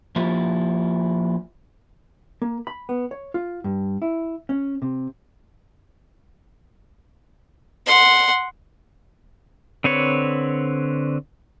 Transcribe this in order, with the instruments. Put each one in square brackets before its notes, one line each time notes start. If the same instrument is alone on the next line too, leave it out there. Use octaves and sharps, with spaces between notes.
[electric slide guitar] F3 A#3 E4 F4 G4
[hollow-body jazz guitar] A#3
B5
B3
C#5
F4
G2
E4
C#4
C3
[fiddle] F#5 C6
[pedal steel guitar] D3 C4 B4 C#5